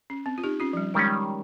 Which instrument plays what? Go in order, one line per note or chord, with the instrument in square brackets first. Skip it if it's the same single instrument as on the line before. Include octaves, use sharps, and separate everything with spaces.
[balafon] C#4
C4
F4
D#4 G4
C#4 F4
F3
G3
[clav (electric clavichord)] D#3 G3 C#4 [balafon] G#3